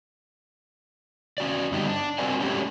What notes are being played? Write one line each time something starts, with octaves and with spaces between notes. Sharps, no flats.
C#4 F#4 D5
G2 D3 B3 D#4 G4
D4
C4 F#4 A#4 D5 G#5
G#3 A3 C#4 D4 F#4 G4